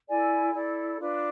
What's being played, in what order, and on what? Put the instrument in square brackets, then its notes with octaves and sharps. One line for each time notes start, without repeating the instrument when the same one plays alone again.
[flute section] E4 A4 D5 G#5
E4 A4 D5
D4 F4 B4